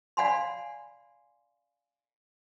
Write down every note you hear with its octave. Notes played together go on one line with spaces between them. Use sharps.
D5 F5 F#5 G#5 B5 C6